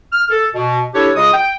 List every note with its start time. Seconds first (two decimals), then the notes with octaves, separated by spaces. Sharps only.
0.12 F6
0.30 A4
0.55 B2
0.94 D4 E4 G4 A4 C#5
1.16 C#3 G#3 F4 D#5 D#6
1.33 G5